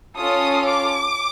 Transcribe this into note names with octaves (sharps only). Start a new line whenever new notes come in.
C#4 F4 A4 D#6
D6